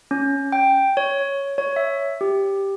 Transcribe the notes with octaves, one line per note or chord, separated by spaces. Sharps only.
C#4
G5
C#5
C#5
E5
G4